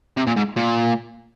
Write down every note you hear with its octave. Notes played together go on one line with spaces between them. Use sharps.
C3
A#2
G#2
A#2